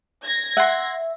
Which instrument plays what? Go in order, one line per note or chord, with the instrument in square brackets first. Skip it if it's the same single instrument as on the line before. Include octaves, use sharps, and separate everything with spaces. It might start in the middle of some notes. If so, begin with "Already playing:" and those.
[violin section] G#6 A#6
[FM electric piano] E5 [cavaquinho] F#5 C6